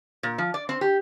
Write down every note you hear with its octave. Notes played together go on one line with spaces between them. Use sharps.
A#2
F3
D5
C4
G4